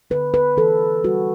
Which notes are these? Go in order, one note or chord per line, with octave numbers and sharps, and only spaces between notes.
D3 B4
B4
E3 A4
G3 F#4